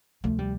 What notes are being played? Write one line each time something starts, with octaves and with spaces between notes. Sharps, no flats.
D2 C3 F3 A3
G3